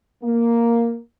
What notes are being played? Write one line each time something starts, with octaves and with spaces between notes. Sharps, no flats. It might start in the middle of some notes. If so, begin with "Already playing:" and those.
A#3